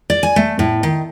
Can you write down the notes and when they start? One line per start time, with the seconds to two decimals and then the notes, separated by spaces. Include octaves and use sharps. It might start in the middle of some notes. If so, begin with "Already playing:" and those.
0.10 D5
0.23 G#5
0.36 A3
0.59 A2
0.83 D#3